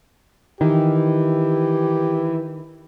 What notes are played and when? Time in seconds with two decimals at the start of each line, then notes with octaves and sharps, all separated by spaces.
0.61 D#3 E3 G4